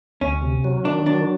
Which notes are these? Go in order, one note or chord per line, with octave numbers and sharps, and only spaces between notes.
D2 C#4
C3
F#3
D#3 D4
F#3 D4